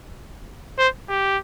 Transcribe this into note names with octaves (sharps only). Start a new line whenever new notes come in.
C5
G4